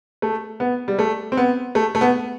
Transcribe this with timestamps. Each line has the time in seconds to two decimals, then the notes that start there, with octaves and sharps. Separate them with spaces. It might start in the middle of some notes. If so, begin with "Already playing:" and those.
0.22 A3
0.60 B3
0.88 G3
0.99 A3
1.32 C4
1.37 B3
1.75 A3
1.95 A3
2.01 B3